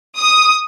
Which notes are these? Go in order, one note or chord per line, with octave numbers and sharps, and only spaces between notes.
D#6